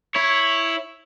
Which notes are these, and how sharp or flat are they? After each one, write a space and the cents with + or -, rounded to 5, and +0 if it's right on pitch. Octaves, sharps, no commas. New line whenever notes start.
E4 +0 C#5 +0